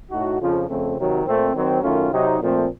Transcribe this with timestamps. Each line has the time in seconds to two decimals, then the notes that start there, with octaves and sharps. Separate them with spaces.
0.11 A2 A3 D#4 F#4
0.40 F2 C#3 F3
0.68 F2 C#3 F3 A3 C4
0.97 C3 D#3 F#3
1.26 A#2 A3 C4
1.54 D#3 F#3 C4
1.82 F#2 D#3 A3 C#4 F4
2.11 C3 F#3 C4 D#4
2.39 A#2 F3 A3 C4